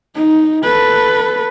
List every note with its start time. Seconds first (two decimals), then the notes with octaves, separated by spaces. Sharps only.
0.15 D#4
0.63 A4 B4